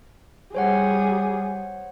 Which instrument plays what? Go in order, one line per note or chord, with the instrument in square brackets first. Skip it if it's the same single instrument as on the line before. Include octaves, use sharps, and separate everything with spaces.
[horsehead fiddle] G3 G#4 [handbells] C5 C#5 F#5